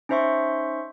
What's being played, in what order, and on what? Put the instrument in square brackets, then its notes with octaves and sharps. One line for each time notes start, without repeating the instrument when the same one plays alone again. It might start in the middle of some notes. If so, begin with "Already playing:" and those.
[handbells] C#4 D#4 C5 E5 C6 C#6